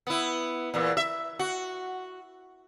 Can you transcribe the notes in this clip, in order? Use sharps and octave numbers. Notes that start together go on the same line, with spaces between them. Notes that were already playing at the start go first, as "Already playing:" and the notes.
B3 E4
E2 A#2 E3
E5
F#4